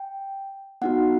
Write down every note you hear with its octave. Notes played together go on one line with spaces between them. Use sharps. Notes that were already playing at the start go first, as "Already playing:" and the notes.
Already playing: G5
B3 D#4 F#4 F#5